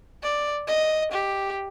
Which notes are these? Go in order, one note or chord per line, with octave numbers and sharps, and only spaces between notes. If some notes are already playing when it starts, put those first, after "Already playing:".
D5
D#5
G4